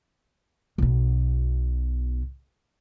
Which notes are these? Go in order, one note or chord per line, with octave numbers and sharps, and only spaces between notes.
B1 B2